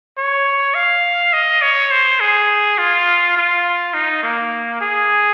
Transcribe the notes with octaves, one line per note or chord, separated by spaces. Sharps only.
C#5
F5
D#5
C#5
C5
G#4
F4
F4
D#4
A#3
G#4